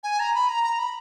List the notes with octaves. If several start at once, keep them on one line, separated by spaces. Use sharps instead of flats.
G#5
A#5
B5
A#5
A#5
B5